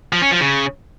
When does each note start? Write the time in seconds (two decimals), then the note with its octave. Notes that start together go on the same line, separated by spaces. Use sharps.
0.13 F3
0.22 C#4
0.31 F3
0.41 C#3